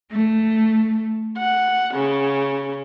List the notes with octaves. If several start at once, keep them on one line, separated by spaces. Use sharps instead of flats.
A3
F#5
C#3